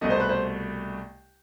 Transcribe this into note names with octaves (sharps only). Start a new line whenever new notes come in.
C2 B2 A3 D#5
C5
B4
C5